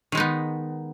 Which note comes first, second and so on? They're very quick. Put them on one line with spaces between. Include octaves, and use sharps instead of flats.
D#3 G#3 D#4 B3